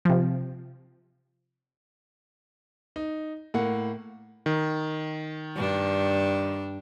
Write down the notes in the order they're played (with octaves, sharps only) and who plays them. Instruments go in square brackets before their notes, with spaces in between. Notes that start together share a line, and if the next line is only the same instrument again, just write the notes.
[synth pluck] C3 F3
[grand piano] D#4
A2 A#3 F#5
[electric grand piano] D#3
[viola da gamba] G2 D4